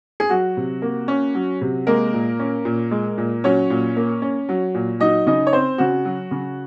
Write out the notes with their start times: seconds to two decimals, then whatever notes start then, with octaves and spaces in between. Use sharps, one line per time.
0.20 G#4
0.30 F#3 F#4
0.57 C3
0.82 A#3
1.08 C#4
1.35 F#3
1.61 C3
1.87 G#3 A#3 A#4
2.14 A#2
2.39 C#4
2.65 A#2
2.91 G#3
3.18 A#2
3.44 F#3 C#4 C#5
3.70 A#2
3.97 A#3
4.22 C#4
4.49 F#3
4.74 A#2
5.00 F#3 D#4 D#5
5.27 C#3 D#4 D#5
5.47 C#5
5.53 C4 C5
5.78 C#3 F#4
6.05 F#3
6.31 C#3